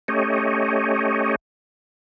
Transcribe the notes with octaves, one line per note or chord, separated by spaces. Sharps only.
A3 C#4 G4 C#5 D#5